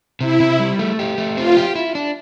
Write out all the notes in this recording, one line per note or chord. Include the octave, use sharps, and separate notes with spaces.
C3 E4
C3
G3
A3
G4
A3
C4 F4
G4
E4
D4